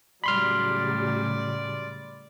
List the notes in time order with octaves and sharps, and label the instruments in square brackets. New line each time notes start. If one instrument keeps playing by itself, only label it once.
[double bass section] A2 C#3 [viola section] F#3 G3 [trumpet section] D5 [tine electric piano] B5 C6 F6